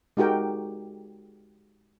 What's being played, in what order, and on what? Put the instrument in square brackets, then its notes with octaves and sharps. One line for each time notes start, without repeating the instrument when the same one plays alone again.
[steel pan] G#3 D#4 F#4 G4 A#4 G5